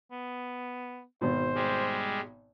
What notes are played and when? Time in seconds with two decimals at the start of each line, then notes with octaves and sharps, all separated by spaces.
0.12 B3
1.21 G#1 B2 C5
1.55 G3 G#3